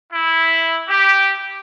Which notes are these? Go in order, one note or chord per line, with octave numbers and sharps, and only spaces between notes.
E4
G4